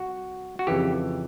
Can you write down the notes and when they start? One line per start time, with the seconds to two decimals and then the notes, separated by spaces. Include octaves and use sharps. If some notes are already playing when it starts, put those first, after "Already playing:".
Already playing: C2 F#4
0.59 F#4
0.67 F2 C#3 E3 G4